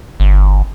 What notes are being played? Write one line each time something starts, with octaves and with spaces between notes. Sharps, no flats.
G1